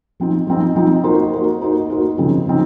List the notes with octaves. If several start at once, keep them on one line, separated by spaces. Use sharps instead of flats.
F3 C4 D#4
F3 C4 D#4
F3 C4 D#4
A#3 D#4 F#4 C5
A#3 D#4 F#4 C5
A#3 D#4 F#4 C5
A#3 D#4 F#4 C5
C#3 F3 C4 D#4 G#4
C#3 F3 C4 D#4